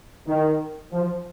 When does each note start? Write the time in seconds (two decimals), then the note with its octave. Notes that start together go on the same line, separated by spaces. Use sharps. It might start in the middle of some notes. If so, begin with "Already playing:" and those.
0.27 D#3
0.92 F3